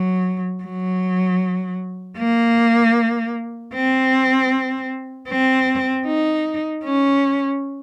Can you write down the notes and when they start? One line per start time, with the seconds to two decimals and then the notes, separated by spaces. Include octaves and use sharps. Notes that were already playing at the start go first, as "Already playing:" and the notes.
Already playing: F#3
0.64 F#3
2.18 A#3
3.74 C4
5.29 C4
6.06 D#4
6.85 C#4